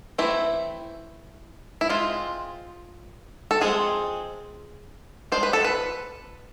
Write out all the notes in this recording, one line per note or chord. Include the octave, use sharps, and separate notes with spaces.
E3 A3 C4 E4
E4
G#3 C4 F4
A4
F3 G#3 C4 G#4
F3 G#3 D4 C5
B4
A4
B4